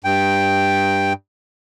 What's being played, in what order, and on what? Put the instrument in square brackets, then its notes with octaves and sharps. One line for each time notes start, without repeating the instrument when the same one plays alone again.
[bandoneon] G2 G5